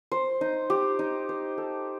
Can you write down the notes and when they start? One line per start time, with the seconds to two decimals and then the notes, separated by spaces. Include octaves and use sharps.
0.12 C5
0.41 D#4
0.70 G4
0.99 D#4
1.29 C5
1.58 A4